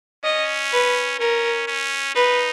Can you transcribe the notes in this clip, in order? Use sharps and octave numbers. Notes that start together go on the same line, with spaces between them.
C#4 D#5
B4
C#4 A#4
C#4
D#4 B4